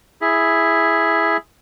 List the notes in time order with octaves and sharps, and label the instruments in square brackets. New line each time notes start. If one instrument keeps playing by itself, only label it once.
[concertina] E4 G#4